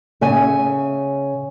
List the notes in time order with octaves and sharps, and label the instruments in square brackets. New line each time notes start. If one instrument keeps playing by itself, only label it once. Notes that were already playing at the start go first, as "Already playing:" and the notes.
[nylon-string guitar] C#3 E5 G#5